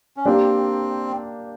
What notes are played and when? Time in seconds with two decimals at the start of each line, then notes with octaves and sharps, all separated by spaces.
0.17 C#4
0.26 A#3 C4 D4 G4 A#4